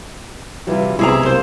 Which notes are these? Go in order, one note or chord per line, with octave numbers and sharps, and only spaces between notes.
C3 E3 F#3 G3 E4 F4
B1 C3 G#3 E4 G#4 D5 A#5
F#2 A#3 C5